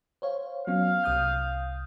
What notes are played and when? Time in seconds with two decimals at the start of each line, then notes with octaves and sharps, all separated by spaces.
0.22 C5 C#5 F5
0.67 F#3 B3 C#4 F5
1.04 C2 D#6 G6